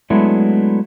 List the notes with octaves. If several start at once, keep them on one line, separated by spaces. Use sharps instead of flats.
F#3 G#3 A3 B3 D4 E4